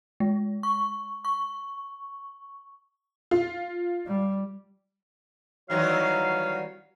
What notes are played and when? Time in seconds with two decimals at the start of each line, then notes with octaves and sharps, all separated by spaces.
0.20 G#3
0.63 C#6
1.25 C#6
3.31 F4
4.07 G3
5.70 D#3 E3 F#3 G3 F#4 C#5 F5